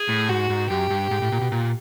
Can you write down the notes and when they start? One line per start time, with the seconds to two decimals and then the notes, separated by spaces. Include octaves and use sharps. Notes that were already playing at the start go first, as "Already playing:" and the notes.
Already playing: G#4
0.09 A2
0.28 G#2 F#4
0.50 G#2
0.70 F#2 G4
0.90 G2
1.11 G#2
1.22 A2
1.32 A#2
1.41 B2
1.52 A#2